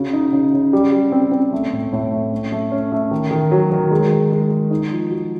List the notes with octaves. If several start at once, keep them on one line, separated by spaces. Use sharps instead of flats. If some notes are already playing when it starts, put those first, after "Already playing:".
Already playing: C#3 F#4
D#4
C#3
C#3
G3
G3
C4
C4
A3
A2
A2
A3
C#4
A3
C#4
A3
D#3
D#3
F#3
D#3
G#3
D#3
G#3
G#3
D#4
F3
F#4